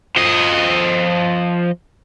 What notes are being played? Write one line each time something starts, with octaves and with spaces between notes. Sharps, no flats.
F3 D#5